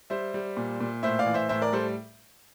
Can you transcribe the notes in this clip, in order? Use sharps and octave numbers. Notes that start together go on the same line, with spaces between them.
G3 C5 E5
G3
A#2
A#2
A2 C5 E5
D5 F5
E3
C5 E5
A2 C5 E5
A#4 D5
G3 A4 C5